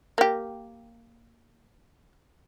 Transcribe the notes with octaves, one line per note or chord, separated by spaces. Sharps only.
A#3 G4